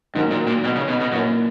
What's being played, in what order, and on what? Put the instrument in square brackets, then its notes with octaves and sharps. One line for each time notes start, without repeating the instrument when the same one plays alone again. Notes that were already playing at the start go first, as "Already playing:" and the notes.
[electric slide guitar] G#2 [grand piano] D#3 F#3 A#3 D#4
[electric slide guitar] A#2
A#2
B2
C#3
B2
B2
[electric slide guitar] F#2 [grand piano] A#2 A#3 E4